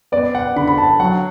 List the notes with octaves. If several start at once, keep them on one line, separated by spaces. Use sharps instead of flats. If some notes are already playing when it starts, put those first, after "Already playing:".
B3 D5
F#5
D3 B5
B5
A5
F#3 F#5